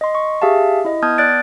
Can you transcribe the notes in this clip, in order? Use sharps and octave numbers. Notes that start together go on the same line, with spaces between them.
D#5 C6
C#6
G4 G#4 E5 F5 A5
E4 D#5
B3 A5 D#6 F6 G6 G#6
D5 F#6 A6 D7